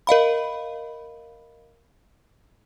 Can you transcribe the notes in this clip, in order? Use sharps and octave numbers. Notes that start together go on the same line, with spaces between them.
A#4 D#5 F5 B5